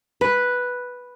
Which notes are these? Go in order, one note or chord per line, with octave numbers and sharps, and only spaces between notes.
B4